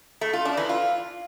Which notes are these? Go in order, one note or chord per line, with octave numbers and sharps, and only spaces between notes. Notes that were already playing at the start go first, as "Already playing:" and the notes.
A3
F4
D4
E3
F4